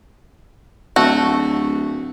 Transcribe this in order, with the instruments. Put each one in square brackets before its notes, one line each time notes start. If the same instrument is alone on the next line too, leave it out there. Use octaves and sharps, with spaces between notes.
[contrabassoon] D1 [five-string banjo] A3 F#4